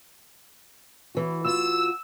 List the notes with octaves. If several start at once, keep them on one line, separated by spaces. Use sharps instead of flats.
E3 F#4
F4 F#4 E6